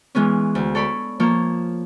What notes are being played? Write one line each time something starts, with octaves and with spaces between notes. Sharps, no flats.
E3 G#3 B3 C#4
D2
A4 C#5 D5 B5
F3 A#3 C#5